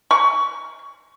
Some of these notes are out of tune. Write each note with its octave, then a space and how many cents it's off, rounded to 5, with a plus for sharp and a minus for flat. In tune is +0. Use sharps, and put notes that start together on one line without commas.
C#6 +25